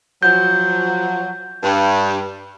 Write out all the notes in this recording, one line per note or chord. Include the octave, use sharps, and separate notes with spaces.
F3 F#3 G6
G2